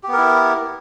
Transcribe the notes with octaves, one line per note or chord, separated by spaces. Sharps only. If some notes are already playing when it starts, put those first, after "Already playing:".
B3 E4 G4 A#4